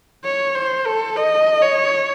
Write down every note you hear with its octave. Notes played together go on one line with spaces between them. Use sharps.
C#5
C5
A4
D#5
C#5